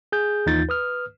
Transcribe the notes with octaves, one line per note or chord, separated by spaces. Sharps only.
G#4 G6
D#2 E3 D#4 F4 G6 A6
B4 D#6 F6